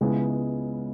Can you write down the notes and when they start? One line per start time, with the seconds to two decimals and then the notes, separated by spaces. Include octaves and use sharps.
0.01 C#2 C#3 G#3 B3 E4